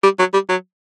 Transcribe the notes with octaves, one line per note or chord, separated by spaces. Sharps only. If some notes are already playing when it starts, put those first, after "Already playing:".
G3
F#3
G3
F#3